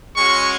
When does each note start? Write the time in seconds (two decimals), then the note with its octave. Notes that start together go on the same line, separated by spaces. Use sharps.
0.17 G#3 C#4 F#4 C#6